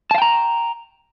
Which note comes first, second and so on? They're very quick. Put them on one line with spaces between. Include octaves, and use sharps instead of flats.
A5 F5 G5 A#5